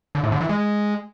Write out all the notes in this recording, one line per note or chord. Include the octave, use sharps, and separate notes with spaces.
D3
A2
D3
E3
G#3